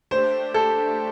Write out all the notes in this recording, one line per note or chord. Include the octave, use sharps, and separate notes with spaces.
A3 D4 G4 C5
A4